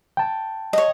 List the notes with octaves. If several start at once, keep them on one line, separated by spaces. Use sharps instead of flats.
G5 A5
C#5 D#5